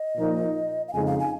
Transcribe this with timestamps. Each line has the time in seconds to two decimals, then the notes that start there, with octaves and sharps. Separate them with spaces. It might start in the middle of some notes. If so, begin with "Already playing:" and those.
Already playing: D#5
0.17 A#2 F3 A#3 D#4
0.88 F5
0.93 F2 C#3 G#3 D#4 G#5
1.06 F5
1.19 G#5